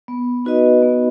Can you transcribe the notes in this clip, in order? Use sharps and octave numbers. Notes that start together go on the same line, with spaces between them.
B3
D#4 F#4 B4 D#5
B3